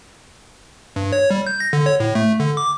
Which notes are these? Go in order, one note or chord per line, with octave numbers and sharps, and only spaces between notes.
G2
C#5
G3
G6
A#6
D3
C#5
A2
A3
D3
D6